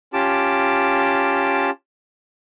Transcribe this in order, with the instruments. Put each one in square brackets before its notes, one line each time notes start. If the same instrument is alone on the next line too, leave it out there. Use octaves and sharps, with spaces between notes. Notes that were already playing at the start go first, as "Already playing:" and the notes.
[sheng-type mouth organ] C#4 F4 G4 A5 D6